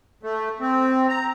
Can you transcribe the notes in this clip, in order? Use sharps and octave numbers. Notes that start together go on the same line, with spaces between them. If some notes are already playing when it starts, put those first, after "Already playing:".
A3
C4
A#5